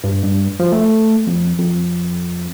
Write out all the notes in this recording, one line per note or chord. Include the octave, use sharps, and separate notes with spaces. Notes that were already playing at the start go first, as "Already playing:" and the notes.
G2
G2
F3
A3
F2
F2